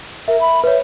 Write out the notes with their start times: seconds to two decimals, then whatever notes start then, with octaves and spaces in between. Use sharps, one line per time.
0.28 A#4 E5
0.41 B5
0.64 B4 C#5 E5